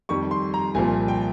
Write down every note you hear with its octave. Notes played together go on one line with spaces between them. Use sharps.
F2 D#3 G3 C#6
C6
A#5
C2 A#2 F3 G#5
G5